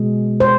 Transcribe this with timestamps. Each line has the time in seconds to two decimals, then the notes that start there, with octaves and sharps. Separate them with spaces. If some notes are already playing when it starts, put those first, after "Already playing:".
Already playing: B2 G#3
0.40 C5